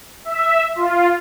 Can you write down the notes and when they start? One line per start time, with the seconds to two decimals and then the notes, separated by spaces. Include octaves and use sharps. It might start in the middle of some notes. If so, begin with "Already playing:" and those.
0.25 E5
0.76 F4